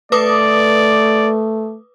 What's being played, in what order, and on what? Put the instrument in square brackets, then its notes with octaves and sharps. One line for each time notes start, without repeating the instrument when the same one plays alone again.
[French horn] A3 [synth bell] B4 D6 D#6 [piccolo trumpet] D5